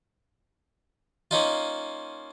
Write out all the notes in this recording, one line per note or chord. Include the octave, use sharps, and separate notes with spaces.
A#3 C#4 D#4 F4